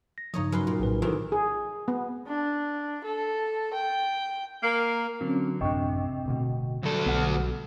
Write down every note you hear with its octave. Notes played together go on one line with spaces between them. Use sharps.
A#6
G2 C#3 F3 D#4 C#5 D#5
F#2 B4 C6
A#2
A#1 A2 B4
C3 D#3 E3 F4 A4 B4
G#4
B3
D4
A4
G5
A#3
D3 F#3 C4 C#4
A1 F#2 C3 D4 D#5 G5 C#6
D1 D2 B2
D2 F#3 G3 A4
B1 B3 F#5 F6